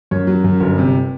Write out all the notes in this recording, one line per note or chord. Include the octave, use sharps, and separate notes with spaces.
F#2 C#5
F#3
F#2
G1
C3